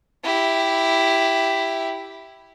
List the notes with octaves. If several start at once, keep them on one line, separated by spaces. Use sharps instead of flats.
E4 G4